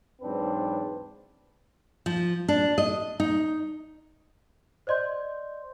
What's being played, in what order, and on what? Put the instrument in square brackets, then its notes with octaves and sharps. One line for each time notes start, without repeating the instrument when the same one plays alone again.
[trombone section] E2 G#2 F#3 C4 D4 B4
[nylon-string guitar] F3
D4
D#5
D#4
[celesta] C5 D5 D#5 C6 G6